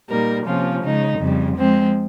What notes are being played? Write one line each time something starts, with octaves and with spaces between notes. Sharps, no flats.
A#2 G3 A#3 D#4 A#4
C3 F3 A#3 C#4 F4
C#3 G#3 D#4
F2 C#3 G3
F3 G#3 C4